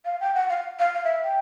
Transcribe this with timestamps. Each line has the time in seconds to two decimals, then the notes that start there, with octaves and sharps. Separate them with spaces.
0.05 F5
0.21 G5
0.35 F#5
0.49 F5
0.79 F5
0.95 F5
1.04 E5
1.24 G5